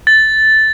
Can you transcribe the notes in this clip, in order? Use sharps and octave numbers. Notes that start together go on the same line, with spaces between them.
A6